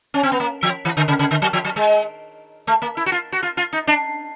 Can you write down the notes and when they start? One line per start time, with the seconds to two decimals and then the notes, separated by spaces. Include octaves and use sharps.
0.14 C#4
0.23 C4
0.32 B3
0.40 A#3
0.63 F3
0.85 E3
0.97 D3
1.08 C#3
1.19 C#3
1.31 D3
1.42 F#3
1.53 F3
1.65 F#3
1.76 G#3
2.67 A3
2.82 A#3
2.97 E4
3.06 F#4
3.12 F4
3.32 F#4
3.43 F4
3.57 F4
3.73 D#4
3.87 D4